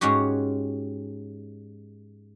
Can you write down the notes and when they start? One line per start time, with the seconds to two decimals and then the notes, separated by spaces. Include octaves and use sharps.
0.01 G#2 G#3 C#4 F#4 G4